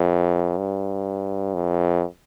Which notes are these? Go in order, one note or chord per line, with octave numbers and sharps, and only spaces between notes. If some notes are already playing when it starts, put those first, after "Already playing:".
Already playing: F2
G2
F2